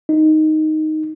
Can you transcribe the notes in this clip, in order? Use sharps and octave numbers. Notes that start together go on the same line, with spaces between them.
D#4